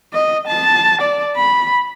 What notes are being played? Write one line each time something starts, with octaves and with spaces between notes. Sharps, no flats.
D#5
A5
D5
B5